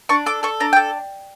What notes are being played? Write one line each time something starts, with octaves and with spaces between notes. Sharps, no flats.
D4 C#6
A4 D6
A4 C#6
D4 A#5
G5
A4